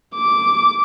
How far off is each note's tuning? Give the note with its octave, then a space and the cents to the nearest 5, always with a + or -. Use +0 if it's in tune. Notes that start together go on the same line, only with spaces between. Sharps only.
D6 -10